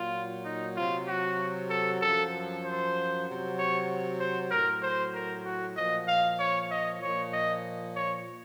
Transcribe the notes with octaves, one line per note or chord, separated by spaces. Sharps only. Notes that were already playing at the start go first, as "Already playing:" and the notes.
Already playing: A#2 F#3 F4
D#4
C3 F#3 F4
F#4
A4
F#2 F3 A4
C5
C3 F#3
C#5
C5
A2 F#3 A#4
C5
A#4
F#4
A#2 F3 D#5
F5
C#5
D#5
A#2 F3 C#5
D#5
C#5